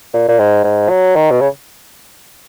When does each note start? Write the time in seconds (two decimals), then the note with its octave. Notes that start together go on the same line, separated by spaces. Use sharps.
0.14 A#2
0.28 A#2
0.40 G#2
0.64 G#2
0.89 F#3
1.16 D#3
1.31 B2
1.41 C#3